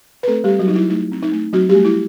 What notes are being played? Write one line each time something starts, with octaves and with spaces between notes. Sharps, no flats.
B4
A3 C4 A4
G3 C4 G4
F#3 F#4
D#4
F#3
E4
A3 D#4
C4
D#4
A3
F#3 C4 F#4
G3 G4
A3
E4